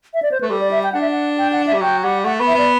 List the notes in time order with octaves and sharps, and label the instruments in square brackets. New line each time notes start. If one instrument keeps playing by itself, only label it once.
[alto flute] E5
D5
C5
[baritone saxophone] A3 [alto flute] B4
[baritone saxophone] G3 [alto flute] A4
[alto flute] D5
E5
G5
[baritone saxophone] D4 [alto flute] F#5
[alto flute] E5
F#5
G5
F#5
E5
[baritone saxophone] G3
[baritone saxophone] F#3 [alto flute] G5
[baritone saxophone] G3 [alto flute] F#5
[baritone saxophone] A3 [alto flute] F#5
[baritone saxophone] B3
[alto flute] E5
[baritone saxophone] B3 [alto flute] D5